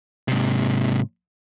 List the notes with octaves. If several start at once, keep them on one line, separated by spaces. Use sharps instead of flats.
G#2 C3